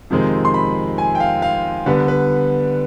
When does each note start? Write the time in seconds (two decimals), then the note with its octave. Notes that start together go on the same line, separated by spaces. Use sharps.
0.10 F2 C3 D#3 G#3 C4
0.45 C6
0.54 B5
0.98 G#5
1.15 G5
1.20 F5
1.42 F5
1.86 D3 G3 B3 B4
2.08 B4